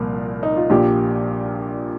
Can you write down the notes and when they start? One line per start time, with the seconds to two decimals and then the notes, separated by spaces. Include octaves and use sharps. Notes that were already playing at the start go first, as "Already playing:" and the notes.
Already playing: C2 A#2 F3 A#4
0.43 D#4
0.57 F4
0.70 A#1 A#2 F3 G4